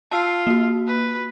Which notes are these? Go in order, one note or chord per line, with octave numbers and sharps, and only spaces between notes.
F4 A5 E6 C7
A#3 F#4
B4